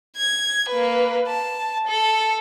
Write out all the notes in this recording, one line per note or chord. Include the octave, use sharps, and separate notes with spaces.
G#6
A#3 B4
A5
A4